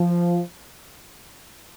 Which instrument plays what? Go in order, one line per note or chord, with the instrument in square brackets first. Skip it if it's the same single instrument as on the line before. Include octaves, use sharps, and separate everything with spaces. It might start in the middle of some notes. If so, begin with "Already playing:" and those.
Already playing: [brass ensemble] F3